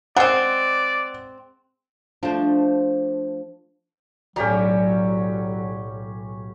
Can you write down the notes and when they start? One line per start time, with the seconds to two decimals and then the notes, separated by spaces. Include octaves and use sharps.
0.16 G#3 C4 D5 F#5
2.23 F3 A3 D4 C5
4.36 B1 A2 D3 F#3 C#4 G4 A#5